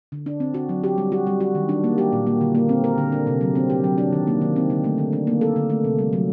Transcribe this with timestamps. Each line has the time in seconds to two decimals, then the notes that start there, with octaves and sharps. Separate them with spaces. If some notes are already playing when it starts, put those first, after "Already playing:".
0.12 D3
0.26 D4
0.40 C4
0.54 F#4
0.69 F#3
0.84 G4
0.98 G3
1.12 F#4
1.27 G3
1.40 F#4
1.55 D#3
1.69 D4
1.84 A#3
1.98 G4
2.13 A#2
2.27 A#3
2.41 D3
2.55 A#3
2.69 C4
2.84 A#4
2.98 D3
3.12 D4
3.27 C3
3.41 F#3
3.55 C4
3.70 G4
3.84 F#3
3.98 D4
4.13 D#3
4.27 A#3
4.41 D#3
4.56 C4
4.70 D3
4.84 A3
4.98 D3
5.13 D4
5.27 A#3
5.41 A4
5.56 D3
5.70 A3
5.84 C3
5.99 G3
6.13 F#3